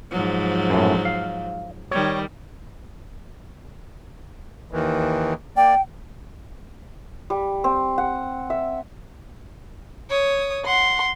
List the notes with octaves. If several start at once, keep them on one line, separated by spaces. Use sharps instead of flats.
G#2 F3 F#3
F#2 A2
F5
D#3 G3 C#5
D#2 D#3 E3
A#3 D5 G5
G3
C4
F#5
E5
C#5 D#6
F#5 C6